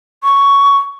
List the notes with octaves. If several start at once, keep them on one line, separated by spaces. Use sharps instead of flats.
C#6